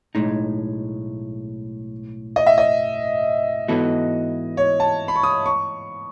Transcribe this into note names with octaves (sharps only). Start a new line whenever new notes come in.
B1 A2 G#3 D#4
D#5
E5
D#5
G#2 E3 B3 F#4 A4
C#5
A5
B5
C#6
D#6
C#6